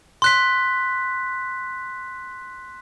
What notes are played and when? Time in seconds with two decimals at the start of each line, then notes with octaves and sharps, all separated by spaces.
0.22 C6 F#6 B6